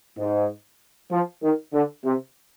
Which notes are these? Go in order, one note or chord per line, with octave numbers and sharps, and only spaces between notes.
G#2
F3
D#3
D3
C3